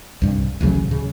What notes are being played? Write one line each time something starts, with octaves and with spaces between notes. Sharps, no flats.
C2 G2
A1 D2 C#3 F#3
C#3